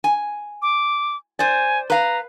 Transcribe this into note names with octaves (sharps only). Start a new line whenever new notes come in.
G#5
D6
C5 D5 G#5
B4 F5 A#5